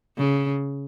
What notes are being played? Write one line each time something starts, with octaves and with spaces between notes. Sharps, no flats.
C#3